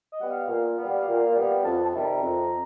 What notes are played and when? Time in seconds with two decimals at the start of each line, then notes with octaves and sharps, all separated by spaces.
0.11 D#5
0.21 G3 B3 F#5
0.30 F5
0.49 A#2
0.78 B3
0.83 G3
1.07 A#2
1.35 G3 B3
1.64 F2 A5
1.83 A5
1.93 C3 D#3 G3
2.02 A#5
2.22 F2